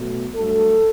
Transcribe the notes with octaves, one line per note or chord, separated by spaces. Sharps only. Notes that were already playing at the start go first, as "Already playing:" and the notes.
Already playing: B2 F#3 A3
G2 F#3 A3 A4